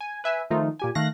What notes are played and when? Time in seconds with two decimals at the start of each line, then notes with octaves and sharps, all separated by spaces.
0.01 G#5
0.24 B4 E5 G#5
0.50 D#3 F3 A3 D#4 F4
0.79 A#2 G4 G#5
0.95 D#3 A3 F5 F#6 A#6